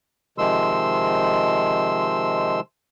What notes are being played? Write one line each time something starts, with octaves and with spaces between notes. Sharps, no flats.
C3 D#3 F3 G#3 C6 E6